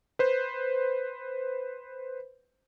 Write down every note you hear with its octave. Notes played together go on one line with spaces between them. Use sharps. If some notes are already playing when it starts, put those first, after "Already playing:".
B4 C5